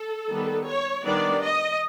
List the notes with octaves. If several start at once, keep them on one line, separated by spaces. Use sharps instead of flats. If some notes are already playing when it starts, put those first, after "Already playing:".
Already playing: A4
D#3 G3 B3
C#5
D#3 G3 B3 D4 D5
D#5